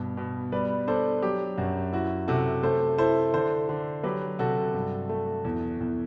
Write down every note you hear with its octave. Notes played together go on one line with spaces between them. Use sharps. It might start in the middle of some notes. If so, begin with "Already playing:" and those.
Already playing: G2 B2
B2
G3 B4 D5
D4 A4 C5
F#3 G4
F#2 F#4
E4 F#4
C3 F#4 A4
A3 A4 C5
E4 A4 C5
D3 A4 C5
D3
F#3 G4 B4
C3 F#4 A4
G2
A3
E2
E2